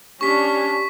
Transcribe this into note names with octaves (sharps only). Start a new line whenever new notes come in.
C#4 D4 G4 C#6 B6